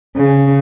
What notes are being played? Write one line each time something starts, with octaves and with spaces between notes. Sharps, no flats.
C#3